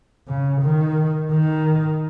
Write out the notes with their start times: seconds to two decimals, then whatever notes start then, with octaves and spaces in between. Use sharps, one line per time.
0.28 C#3
0.62 D#3
1.31 D#3